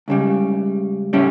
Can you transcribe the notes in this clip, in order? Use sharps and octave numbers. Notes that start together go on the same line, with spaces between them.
C#2 C#3 G3
A2 G3 C#4 E4